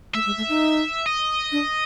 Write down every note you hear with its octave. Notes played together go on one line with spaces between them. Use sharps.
A3 E5
G#3
A3
D#4
D#5
D4